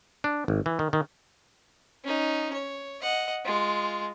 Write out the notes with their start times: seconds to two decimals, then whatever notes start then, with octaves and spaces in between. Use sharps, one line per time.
0.24 D4
0.48 G#1
0.66 E3
0.79 D#3
0.93 D#3
2.04 C#4 D#4
2.53 C#5
3.02 D#5 F#5
3.45 G#3 F4